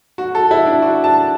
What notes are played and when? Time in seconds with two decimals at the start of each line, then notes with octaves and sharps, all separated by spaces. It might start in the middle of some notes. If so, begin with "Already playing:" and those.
0.18 F#4
0.35 A4
0.51 E4
0.66 D4
0.82 F#4
1.04 A5